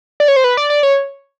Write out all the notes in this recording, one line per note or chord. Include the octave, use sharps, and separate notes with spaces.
D5
C#5
C5
B4
D5
D5
C#5